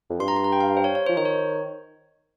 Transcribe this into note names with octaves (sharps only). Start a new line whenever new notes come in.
F2
G2 C6
A#5
C6
A#5
G5
F5
C5
C#5
C#5
C5
F3
D#3 C5
C#5